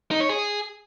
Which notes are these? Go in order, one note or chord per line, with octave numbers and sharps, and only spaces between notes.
D#4
C#5
G#4